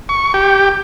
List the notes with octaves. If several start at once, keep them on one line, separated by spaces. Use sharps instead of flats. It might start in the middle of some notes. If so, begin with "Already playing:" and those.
C#6
G4